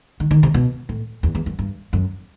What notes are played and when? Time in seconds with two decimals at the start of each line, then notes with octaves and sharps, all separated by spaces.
0.20 D#3
0.31 D#3
0.43 C3
0.54 B2
0.89 A2
1.23 E2
1.35 E2
1.46 F#2
1.59 G2
1.93 F#2